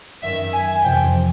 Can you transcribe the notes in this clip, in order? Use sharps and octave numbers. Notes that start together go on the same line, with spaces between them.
F#2 D#3 E5
G#5
F2 C3 E3 G5